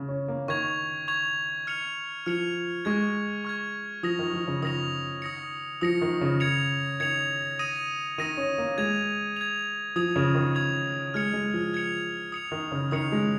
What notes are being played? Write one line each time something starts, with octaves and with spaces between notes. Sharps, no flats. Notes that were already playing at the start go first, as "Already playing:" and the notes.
Already playing: C#3
C#4
A#3
D#3 C#6 G#6 F7
C#6 G#6 F7
F6 C#7 F7
F3 F6 C#7 F7
G#3 C#6 F6 G#6
C#6 F6 G#6
F3 D#6 A#6 F7
D#3
F3
C#3
D#3 D#6 A#6 F7
D#6 A#6 C#7
F3 D#6 A#6 C#7
D#3
C#3
G#6 C#7 F7
D#3 G#6 C#7 F7
D#6 A#6 D#7
D#3 D#6 A#6 D#7
C#4
A#3
G#3 G#6 F7
G#6 F7
F3 D#6 G#6 F7
C#3
D#3
D#6 G#6 F7
G#3 F6 G#6 C#7 F7
G#3
F3
F6 G#6 C#7 F7
D#6 C#7 F7
D#3
C#3
D#3 D#6 C#7 F7
G#3